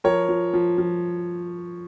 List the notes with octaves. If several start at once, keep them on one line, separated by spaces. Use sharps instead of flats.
F3 A#4 C#5
F3
F3
F3